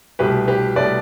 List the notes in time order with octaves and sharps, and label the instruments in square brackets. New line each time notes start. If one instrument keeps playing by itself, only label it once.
[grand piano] C2 B2 A3 G4 B4
G4 B4
C2 B2 A3 B4 D5